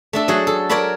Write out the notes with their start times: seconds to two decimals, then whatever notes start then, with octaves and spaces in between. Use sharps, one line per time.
0.13 A3 D4 A4
0.28 F#3 F#4 G#4 F#5
0.47 A4
0.69 A#4 C#5 D5 F#5 A5 B5